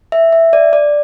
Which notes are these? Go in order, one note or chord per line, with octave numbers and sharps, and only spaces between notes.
E5
E5
D5
D5